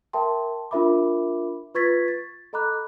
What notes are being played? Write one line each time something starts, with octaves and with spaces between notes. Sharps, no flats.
A#4 E5 G5 A5 C6
D4 F4 A#4 E5 B5 D6
F4 B4 C#6 G#6 A6 B6
A6
A4 D#5 A#5 B5 D6 F#6